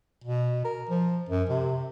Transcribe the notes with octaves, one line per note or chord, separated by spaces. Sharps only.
B2
A#4
F3
F#2
C3